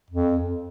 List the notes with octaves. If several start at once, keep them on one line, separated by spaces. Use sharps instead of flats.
F2